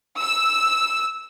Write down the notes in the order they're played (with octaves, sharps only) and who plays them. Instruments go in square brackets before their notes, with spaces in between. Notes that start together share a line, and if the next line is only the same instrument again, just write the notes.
[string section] E6